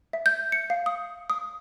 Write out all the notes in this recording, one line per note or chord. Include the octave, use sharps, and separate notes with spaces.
E5
G6
C#7
F5
D#6
D#6